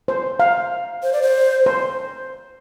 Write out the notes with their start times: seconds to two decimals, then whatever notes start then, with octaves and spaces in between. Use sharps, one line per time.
0.08 C5
0.39 F5
1.03 C5
1.13 D5
1.22 C5
1.66 C5